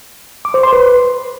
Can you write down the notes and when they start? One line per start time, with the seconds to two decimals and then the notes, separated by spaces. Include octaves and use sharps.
0.45 D6
0.54 C5
0.63 C6
0.73 B4